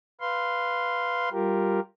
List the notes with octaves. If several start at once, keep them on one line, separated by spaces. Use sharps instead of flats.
B4 F5 C6
G3 F4 G4 A#4